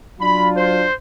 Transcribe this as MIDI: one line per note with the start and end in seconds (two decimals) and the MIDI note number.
0.20 0.86 54
0.20 0.86 62
0.20 0.86 65
0.20 0.49 83
0.55 0.93 72